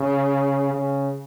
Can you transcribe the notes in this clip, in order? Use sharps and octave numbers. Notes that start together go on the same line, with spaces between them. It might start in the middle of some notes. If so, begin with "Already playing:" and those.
Already playing: C#3
C#3